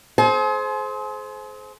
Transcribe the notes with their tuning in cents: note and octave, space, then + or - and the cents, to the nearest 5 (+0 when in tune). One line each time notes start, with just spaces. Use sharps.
G#4 +40 C5 +0 G#5 +45